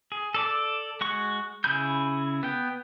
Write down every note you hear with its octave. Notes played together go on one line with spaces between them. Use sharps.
G#4
A4 D5 D6
G#3 F#4 C#6
C#3 E4 G#4 B5 G6
B3 G5